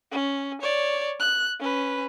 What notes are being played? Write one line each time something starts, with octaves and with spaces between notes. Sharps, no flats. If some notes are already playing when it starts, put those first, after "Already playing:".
C#4
C#5 D5
F#6
C#4 B4